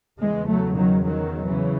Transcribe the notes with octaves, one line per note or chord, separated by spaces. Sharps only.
E2 C#3 E3 G#3
F#3 A3
D#3 F#3
D#3 F#3
C#3 E3